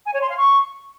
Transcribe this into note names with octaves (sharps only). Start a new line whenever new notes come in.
G#5
C#5
C6
F5
C#6